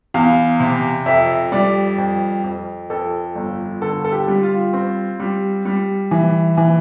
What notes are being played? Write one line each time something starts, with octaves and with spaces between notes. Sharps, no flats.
E2 F5
C3
F2 E5
G3 D5
F2
F2
F2 A4
G1
D3 A4
A4
G4
G3
F4
C4
G3
G3
E3
E3